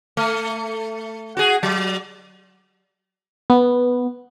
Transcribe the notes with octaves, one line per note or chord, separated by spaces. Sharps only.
A3
F#4 G#4
F#3
B3